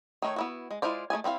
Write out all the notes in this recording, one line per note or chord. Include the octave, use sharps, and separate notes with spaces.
D#3 A3 D#4 C#5
B3 E4 F#4
G#3
G#3 E4 F4 C5 D5
A3 E4 G#4 G#5
G3 C4 E4 F5